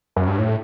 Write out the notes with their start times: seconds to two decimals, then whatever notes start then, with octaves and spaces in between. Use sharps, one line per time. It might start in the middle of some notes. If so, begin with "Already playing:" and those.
0.16 F#2
0.27 G2
0.39 A2